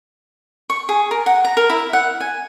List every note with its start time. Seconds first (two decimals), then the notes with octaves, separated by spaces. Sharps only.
0.70 C#6
0.89 G#4
1.11 A#4
1.26 F#5
1.45 A#5
1.57 A#4
1.70 E4
1.93 F#5
2.20 G#5